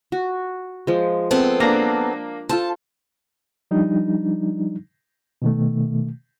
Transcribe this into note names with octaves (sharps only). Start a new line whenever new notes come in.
F#4
F3 G#3
B3 C4 A4
A#3 D4 A#5
F4 A4 C5 A5
F3 G3 D4 D#4
B2 D#3 A3